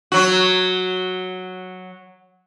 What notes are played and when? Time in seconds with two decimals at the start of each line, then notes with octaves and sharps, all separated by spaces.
0.12 F#3 F#4